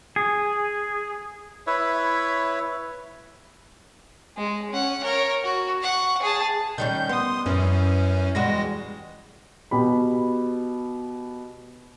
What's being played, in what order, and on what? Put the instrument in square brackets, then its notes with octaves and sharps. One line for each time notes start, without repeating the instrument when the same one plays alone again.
[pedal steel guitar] G#4
[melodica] E4 B4 C#5 E5
[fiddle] G#3
C#4 F#5
A#4 C#5
F#4
F#5 C#6
G#4 A5
[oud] D#3 G3 C#4 [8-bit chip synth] G6
[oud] B3 [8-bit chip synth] C6 D#6
[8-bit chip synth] F#2 C#4 [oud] E3
[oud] E2 G3 F#4 [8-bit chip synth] G#3 A#6
[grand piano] B2 G4 B5